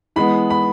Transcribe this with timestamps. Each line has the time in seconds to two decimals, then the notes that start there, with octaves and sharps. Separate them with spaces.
0.16 E3 G#3 B3 B5
0.50 B5